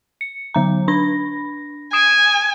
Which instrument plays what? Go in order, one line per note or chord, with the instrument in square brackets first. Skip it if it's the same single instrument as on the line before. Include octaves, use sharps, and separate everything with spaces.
[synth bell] C#7
D3 F#3 A#5
D4 B5 A#6
[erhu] G#5 [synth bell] D#6 D7 E7